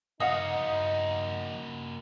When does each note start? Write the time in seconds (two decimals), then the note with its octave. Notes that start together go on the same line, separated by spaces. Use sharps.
0.20 A#3 D#4 F#4 D#5 F5 F#5 D#6